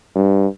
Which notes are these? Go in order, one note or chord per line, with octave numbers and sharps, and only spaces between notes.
G2